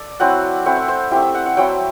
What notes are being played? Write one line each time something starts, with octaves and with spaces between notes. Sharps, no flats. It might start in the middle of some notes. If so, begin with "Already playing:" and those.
Already playing: A4 D5
F#3 C4 E4 F#5
A3 C4 E4 F#5
E5
C5
A3 C4 E4 G4
E5
F#5
F#5
F#3 C4 E4 G5